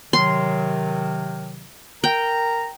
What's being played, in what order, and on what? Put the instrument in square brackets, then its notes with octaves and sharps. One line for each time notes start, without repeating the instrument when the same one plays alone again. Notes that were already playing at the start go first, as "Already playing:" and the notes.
[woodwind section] C3 D#3 F#3 [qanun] C6
[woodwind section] A#4 A#5 [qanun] G5